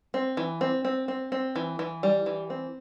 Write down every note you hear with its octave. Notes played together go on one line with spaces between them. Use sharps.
C4
E3
C4
C4
C4
C4
E3
E3
G3
E3
C4